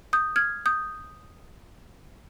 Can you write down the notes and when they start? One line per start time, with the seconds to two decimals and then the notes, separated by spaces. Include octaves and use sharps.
0.13 D#6 G6
0.36 F6 G#6
0.66 D#6 G6